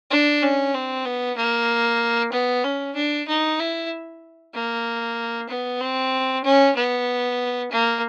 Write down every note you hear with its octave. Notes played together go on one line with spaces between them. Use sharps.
D4
C#4
C4
B3
A#3
B3
C#4
D4
D#4
E4
A#3
B3
C4
C#4
B3
A#3